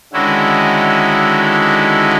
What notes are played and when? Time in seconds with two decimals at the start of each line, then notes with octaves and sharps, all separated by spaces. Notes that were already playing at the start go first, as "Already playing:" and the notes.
0.13 D3 D#3 G#3 C#4 E4 F#4